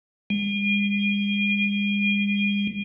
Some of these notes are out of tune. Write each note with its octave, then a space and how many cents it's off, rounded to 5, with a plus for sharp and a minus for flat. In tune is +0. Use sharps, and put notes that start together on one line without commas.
G#3 -45